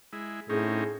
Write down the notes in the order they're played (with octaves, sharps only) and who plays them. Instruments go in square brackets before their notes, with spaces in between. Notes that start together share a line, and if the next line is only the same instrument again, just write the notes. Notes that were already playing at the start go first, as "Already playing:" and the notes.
[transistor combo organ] G#3 E4
[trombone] A2 [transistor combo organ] C4 C#4 D#4 [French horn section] G#4